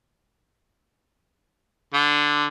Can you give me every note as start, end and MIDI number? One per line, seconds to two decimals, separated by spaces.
1.94 2.46 50